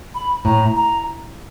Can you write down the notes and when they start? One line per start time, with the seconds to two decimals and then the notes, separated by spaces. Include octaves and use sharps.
0.15 B5
0.45 A2 A#5
0.76 A#5